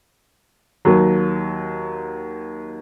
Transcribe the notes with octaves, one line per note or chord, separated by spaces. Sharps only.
D#2 F#3